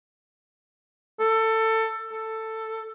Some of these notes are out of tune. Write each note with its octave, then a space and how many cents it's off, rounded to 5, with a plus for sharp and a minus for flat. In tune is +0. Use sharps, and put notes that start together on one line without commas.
A4 +20
A4 +10